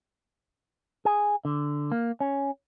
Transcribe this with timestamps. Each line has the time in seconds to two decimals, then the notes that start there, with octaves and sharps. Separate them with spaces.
1.05 G#4
1.45 D3
1.92 A#3
2.20 C#4